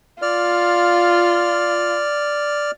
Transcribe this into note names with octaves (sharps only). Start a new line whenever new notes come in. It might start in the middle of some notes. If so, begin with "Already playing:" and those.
F4 D5 F6